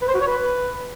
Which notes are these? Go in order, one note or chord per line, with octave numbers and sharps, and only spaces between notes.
B4
C5
F#4
C#5
B4